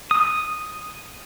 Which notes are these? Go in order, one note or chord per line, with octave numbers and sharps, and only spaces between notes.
D#6